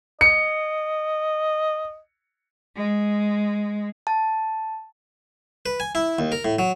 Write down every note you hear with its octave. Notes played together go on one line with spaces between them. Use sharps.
D#5 C#7
G#3
A5
B4
G#5
E4
D#2
A#4
A2
F#3